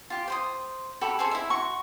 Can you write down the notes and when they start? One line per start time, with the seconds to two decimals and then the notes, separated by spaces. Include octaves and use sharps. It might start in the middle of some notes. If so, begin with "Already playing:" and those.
0.10 F4 G4
0.28 C5 C6 D#6
1.01 F#4 G4 A4 B5
1.19 G#4 A4 C5 C#5
1.31 E4 E5
1.50 F#4 C6 C#6